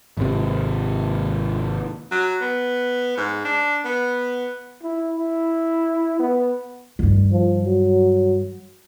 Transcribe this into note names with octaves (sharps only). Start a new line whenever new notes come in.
G#1 C3
F#3
B3
G#2
D4
B3
E4
E4
B3
G2 D#3
F3
F#3